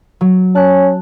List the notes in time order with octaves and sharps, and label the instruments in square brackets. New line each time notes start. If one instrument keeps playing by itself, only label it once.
[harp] F#3
[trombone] C#4 [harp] A5 F#6